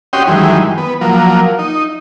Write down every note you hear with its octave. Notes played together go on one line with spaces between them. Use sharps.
C#4 F#4 G4 D#5 G5 C6
F#2 D#3 E3 G3 G#3
B3
F3 F#3 A#3
D#4